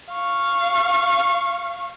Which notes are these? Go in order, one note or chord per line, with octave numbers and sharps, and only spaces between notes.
F5 C#6